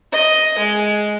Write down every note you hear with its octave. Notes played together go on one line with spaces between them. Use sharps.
D#5
G#3